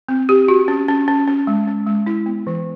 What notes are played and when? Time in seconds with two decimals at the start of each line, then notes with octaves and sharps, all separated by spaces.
0.08 C4
0.29 G4
0.48 F#4
0.68 C#4
0.88 C#4
1.08 C#4
1.28 C#4
1.47 G#3
1.67 C#4
1.87 G#3
2.06 E4
2.26 B3
2.47 E3